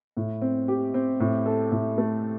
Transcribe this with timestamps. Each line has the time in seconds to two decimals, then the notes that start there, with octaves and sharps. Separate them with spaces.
0.17 A2
0.42 C4
0.68 G4
0.94 C4
1.20 A2
1.46 A4
1.72 A2
1.98 A3